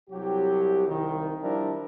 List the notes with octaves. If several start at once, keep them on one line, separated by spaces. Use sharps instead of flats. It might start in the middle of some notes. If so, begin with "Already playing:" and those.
C2 F#3 G4
C2 D#3
F3 G3 D4 E4 A#4